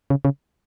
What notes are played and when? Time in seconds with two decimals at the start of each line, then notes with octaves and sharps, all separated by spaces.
0.10 C#3
0.25 C#3